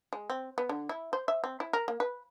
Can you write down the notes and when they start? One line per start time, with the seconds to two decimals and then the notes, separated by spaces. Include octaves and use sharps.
0.13 G#3
0.30 C4
0.58 B3
0.69 D3
0.89 E4
1.13 C5
1.28 E5
1.44 C4
1.60 E4
1.73 A#4
1.88 A#3
2.00 B4